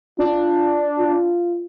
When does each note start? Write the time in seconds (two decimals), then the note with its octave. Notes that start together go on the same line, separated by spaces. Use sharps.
0.19 D4 F4
0.99 F4